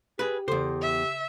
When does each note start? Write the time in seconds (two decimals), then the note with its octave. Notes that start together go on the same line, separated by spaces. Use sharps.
0.19 G4 G#4 B4
0.48 E2 C#3 A4 C5
0.81 E5